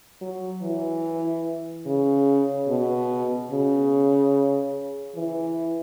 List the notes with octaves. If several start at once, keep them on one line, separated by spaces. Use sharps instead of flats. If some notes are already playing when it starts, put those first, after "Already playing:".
F#3
E3
C#3
B2
C#3
E3